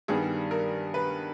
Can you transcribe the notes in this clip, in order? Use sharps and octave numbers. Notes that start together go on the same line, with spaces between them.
G2 D#3 G3 B3 G#4
A#4
B4